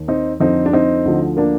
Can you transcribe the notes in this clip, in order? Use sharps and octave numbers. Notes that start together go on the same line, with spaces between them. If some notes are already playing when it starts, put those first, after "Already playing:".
Already playing: D#2 D#3
C4 D#4
F2 D3 F3 C4 D#4
D4
C4 D#4
D2 D3 F3
A#3 D4